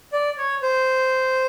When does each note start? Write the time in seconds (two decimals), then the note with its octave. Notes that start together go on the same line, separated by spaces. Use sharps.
0.13 D5
0.38 C#5
0.62 C5